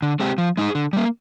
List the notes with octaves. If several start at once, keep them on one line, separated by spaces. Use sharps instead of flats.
D3
G#3 C4 G4
F3
G#3 D#4 G#4
D3
G3 A#3